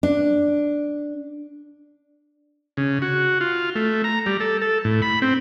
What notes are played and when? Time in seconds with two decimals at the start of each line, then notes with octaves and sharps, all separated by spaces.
0.03 D4
2.77 C#3
3.02 F#4
3.41 F4
3.75 A3
4.04 A#5
4.26 G3
4.40 A4
4.62 A4
4.85 A2
5.02 B5
5.22 C4